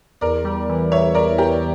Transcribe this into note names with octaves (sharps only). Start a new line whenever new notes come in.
E2 A#4 D5
G3
E3
E2 C#5 E5
E2 A#4 D5
G3 G4 A#4